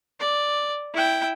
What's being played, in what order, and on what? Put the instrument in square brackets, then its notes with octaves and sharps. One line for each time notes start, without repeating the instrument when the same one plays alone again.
[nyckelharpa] D5
E4 G5